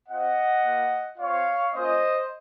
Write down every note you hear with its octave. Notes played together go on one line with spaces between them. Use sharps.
C4 F4 D#5 F#5
A#3 F4
C4 F4 C#5 F5
A#3 C#4 F4 C5 D#5